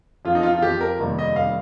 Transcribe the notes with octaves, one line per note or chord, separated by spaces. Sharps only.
F2 F3 F4
D#4
F4
F4
F2 F3 G4
A#4
F1 D#2 D#3 G3
D#5
F1 D#3 G3 F5